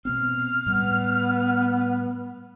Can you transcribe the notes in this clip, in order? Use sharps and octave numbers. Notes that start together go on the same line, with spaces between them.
B2 B3 C4 F6
A2 G3 B3